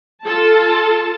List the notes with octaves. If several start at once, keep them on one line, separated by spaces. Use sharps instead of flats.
F4 A4 A5